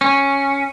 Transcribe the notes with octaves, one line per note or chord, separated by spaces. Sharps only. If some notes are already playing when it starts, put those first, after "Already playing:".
C#4